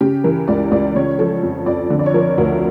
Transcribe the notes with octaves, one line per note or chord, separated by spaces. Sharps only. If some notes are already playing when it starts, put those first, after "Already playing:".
C#3 G4
E3 A#4
C#2 D5
C#2 D5
C#3 C#5
F3 A4
F2
F2 D5
D3
D5
C#5
F3 A#4
D2 A#4